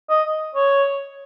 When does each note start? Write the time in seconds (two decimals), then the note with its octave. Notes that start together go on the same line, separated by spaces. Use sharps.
0.09 D#5
0.55 C#5